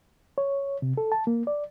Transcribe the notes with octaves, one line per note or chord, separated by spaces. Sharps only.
C#5
C3
A4
A5
A#3
D5